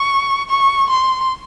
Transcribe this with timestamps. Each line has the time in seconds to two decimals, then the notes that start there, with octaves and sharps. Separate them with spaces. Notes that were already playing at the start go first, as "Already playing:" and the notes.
Already playing: C#6
0.50 C#6
0.90 C6